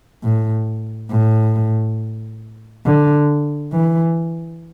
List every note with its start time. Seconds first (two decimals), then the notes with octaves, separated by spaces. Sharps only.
0.23 A2
1.10 A2
2.86 D3
3.73 E3